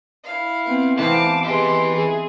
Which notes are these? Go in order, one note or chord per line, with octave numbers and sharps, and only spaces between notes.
E4 F5
B3 C4
E3 B3 C4 F5 A5 D6
G#3 E4 G4 B4 C6
G#4